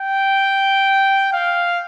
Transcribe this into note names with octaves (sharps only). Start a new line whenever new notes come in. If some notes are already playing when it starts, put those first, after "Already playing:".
Already playing: G5
F5